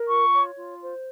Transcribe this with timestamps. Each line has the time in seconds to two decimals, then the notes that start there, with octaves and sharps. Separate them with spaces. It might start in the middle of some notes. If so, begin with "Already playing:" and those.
Already playing: A#4
0.09 F4 C#6
0.33 C#5
0.57 F4
0.82 C5